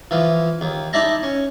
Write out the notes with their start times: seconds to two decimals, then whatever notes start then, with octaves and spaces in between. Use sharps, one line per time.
0.11 E3 F3
0.61 D#2
0.93 D#4 E4 D5 E5 A5 A#5
1.23 C#4